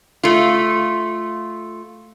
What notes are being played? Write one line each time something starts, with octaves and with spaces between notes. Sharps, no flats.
A3 F4